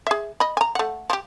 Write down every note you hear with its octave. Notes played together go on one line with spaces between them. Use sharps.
G#4 E5
D#5 B5
G#5 A#5
A3 F#5
F3 G4